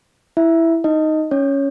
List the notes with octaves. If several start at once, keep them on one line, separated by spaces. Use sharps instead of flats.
E4 E5
D#4 D#5
C#4 C#5